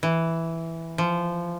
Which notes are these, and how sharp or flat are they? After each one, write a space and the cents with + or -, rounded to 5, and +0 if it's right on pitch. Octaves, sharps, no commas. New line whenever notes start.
E3 +0
F3 -15